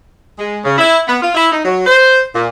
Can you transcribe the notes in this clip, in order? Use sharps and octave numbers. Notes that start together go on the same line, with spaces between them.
G#3
C#3
E4
B3
F4
E4
D#4
F#3
C5
A#2